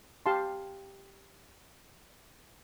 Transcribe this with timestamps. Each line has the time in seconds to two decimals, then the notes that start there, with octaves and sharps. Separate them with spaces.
0.26 G4 F5 A5 C6